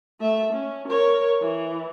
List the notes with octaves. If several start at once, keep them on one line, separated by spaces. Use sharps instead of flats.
A3 E5
C#4
A#4 C#5
E3